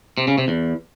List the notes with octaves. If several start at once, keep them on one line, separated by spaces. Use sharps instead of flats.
C3
C#3
C3
E2